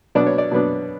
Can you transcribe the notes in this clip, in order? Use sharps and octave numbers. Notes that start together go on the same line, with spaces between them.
B2 F#3 B3 D4 D5
C#5
D5
B2 F#3 B3 D4